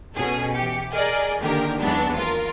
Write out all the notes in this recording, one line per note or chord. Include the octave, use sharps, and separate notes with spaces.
B2 C#4 G#4 A4
E3 G4 C#7
G#4 A#4 D5 D#5
D3 D#3 A#3 G4 A#4
D#2 E3 F#3 G#3 B3 D4
F4 A#4